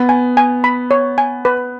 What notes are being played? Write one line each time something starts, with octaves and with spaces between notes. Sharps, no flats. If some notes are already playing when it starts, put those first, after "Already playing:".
Already playing: B3
G#5
G#5
B5
C#5
G#5
B4